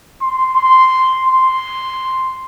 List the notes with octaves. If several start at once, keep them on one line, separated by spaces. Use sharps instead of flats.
C6
C6
C6